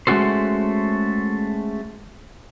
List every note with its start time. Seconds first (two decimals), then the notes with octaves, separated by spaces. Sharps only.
0.07 G#3 A3 C#4 F#4 A4 C5